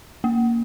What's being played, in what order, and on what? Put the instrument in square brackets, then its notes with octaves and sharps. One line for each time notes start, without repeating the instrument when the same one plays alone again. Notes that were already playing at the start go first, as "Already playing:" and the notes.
[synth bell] A#3